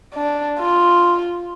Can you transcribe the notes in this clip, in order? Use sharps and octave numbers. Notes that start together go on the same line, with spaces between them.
D4
F4